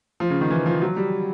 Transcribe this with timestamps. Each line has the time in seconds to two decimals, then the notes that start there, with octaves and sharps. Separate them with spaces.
0.20 F3
0.30 C#3
0.41 D#3
0.50 E3
0.66 F3
0.82 F#3
0.96 G3